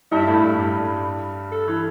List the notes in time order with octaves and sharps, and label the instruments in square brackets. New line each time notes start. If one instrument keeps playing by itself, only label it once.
[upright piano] G2 G3 [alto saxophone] E4
[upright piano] A2 A3
G2 G3
G2 G3
[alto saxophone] A4
[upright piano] E3